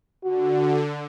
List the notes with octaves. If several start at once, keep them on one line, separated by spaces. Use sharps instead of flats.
D3 F#4